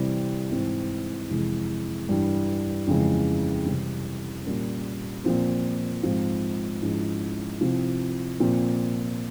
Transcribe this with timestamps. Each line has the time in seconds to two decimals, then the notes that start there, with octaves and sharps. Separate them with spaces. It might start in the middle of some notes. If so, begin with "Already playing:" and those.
Already playing: C3 E3 G3 C4
0.50 G#2 E3 G#3 C4 E4
1.29 F2 C3 E3 G#3
2.08 G2 E3 G3
2.87 F2 C#3 E3 G#3
3.66 C3 E3 G3 C4 E4
4.46 A#2 G3 A#3 C#4
5.25 A#2 F3 C4
6.03 G#2 F3 C4
6.82 G#2 F3 G#3 C#4 E4
7.61 C3 F3 C4 E4
8.40 A#2 F3 C4